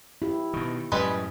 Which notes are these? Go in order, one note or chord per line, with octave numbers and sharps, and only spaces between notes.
E4 G4
B2 D#3
F#2 A2 C#3 G3 G#3 B4